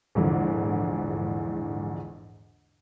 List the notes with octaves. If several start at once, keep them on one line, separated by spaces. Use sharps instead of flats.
A#1 E2 G#2 D3 E3 F3